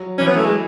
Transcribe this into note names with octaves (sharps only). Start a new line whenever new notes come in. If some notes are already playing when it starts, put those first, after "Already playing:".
Already playing: F#3
E3 C#4
B3
A3
G#3